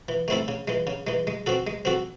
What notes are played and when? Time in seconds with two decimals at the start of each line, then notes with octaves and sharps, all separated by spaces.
0.09 E3
0.28 A3 C4 E4 A4
0.48 C#3
0.68 E3 G#3
0.87 C#3
1.07 E3 G#3
1.27 G#3
1.46 C4 F#4 A4
1.67 G#3
1.85 C4 F#4 A4